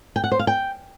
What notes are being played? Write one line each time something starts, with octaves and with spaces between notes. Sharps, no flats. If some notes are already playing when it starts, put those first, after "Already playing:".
G5
F#5
C5
F5
G5